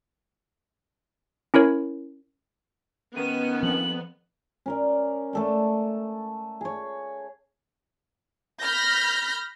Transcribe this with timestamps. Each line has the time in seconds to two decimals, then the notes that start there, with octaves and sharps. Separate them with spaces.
1.54 C#4 E4 A#4 C#5
3.16 D#3 B3 C#4 D#7
3.63 F3 C4 F#7
4.66 C#4 A#4 D5
5.33 A3 A4 D5
6.61 G#4 C#5
8.61 B5 F6 G6 A#6